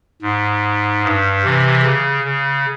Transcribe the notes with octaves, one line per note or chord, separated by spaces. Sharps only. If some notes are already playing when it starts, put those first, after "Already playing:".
G#2
G2
C3 E3
C#3
C#3